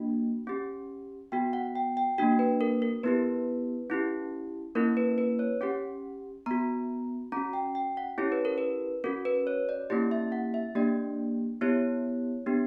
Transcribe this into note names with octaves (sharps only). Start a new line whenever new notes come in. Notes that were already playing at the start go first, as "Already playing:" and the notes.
Already playing: A#3 D4 F#4
C#4 G4
B3 F#4 G5
F#5
G5
G5
A#3 D4 F#4 G5
B4
A#4
A#4
B3 E4 G4 B4
C#4 E4 G4
A#3 C#4 E4 A#4
B4
B4
C#5
C#4 G4 F#5
B3 F#4 A#5
C#4 F#4 A#5
G5
G5
F#5
C#4 E4 G4 C#5
B4
A#4
B4
C#4 F#4 A#4
B4
C#5
D5
A#3 C#4 E4 G4 D5
E5
F#5
E5
A#3 D4 G4 D5
B3 E4 G4 C#5
B3 D4 G4